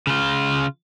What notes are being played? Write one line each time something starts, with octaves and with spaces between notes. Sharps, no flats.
C#3 F4